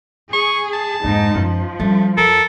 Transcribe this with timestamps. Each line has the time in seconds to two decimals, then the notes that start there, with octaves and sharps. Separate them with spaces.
0.33 G#4 C#6
0.73 A5
1.04 F2 G#2 A#3 D#4
1.35 F#2 F3
1.80 G3 A3 C#4
2.17 F2 A4 A#4